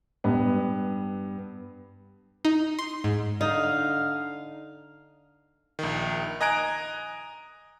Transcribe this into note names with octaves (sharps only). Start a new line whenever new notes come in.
G2 B3
D#4
C6
G#2
D3 D#4 F5
A#1 D#3
D#5 G#5 A#5 F#6 G#6 D7